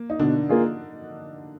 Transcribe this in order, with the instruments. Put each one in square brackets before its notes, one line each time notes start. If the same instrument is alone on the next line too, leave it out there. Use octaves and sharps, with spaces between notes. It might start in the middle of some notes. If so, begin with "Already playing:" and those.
Already playing: [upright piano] A#3
D#4
[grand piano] B2 [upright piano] D3 D4
[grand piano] A#3 F4 G#4